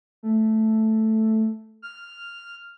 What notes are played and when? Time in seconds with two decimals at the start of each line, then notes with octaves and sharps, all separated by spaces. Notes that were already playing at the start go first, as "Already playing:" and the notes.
0.23 A3
1.82 F6